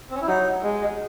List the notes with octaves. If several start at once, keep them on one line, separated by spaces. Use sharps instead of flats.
C4
C#4
E4
F#3 D#4
G#3